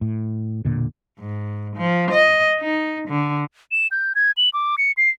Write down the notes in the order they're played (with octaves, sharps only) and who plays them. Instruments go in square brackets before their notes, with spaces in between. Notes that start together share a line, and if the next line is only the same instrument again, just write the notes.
[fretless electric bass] A2
E1 A#1 A#2 D3
[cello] G#2
F3
D#5
D#4
D3
[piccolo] E7
G6
G#6
F#7
D6
C#7
C7